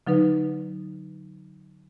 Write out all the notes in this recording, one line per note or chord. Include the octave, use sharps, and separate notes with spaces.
D3 F#3 D#4 B4